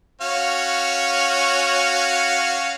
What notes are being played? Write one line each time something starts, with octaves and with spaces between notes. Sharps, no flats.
C#4 F#4 F5